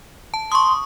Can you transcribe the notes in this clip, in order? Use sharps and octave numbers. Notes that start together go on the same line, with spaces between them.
A5
C6 C#6 D#6